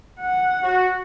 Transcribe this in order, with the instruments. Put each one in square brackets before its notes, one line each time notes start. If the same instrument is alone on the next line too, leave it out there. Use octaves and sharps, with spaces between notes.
[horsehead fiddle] F#5
[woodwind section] F#4